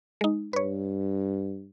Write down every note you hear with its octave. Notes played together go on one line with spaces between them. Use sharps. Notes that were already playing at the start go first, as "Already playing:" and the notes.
G#3 D#4
G2 B4 C#5